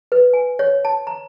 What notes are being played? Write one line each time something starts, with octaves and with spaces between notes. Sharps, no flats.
B4
G#5
C#5
A5
A#5